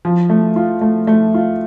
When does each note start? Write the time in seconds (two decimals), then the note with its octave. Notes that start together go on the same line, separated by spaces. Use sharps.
0.05 F3
0.30 A3
0.56 F4
0.81 A3
1.07 A3
1.34 F4